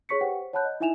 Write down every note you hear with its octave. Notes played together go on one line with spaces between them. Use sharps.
G#4 C#5 C#6 B6 C#7
G4 B4 C5 F#5 G5
C5
C#5 F#5 A5 B5 F#6 G6
D#5
D#4 E4 E5 G#5 E7 F7